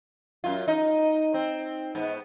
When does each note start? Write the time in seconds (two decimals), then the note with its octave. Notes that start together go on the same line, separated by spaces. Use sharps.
0.44 F#2 F4
0.68 D#4
1.34 C4
1.95 G#2 B3